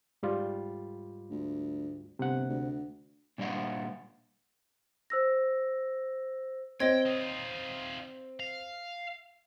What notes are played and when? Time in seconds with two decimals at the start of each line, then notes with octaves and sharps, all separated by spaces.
0.23 G#2 G3 F4
1.30 D2
2.19 G1 C3 F#5
2.49 D2
3.38 A#2 G3 D4 D#5 F5 F#5
5.10 C5 E6 A#6
6.80 C4 C#5 D#5 G5 G#6
7.06 D#4 F4
8.40 F5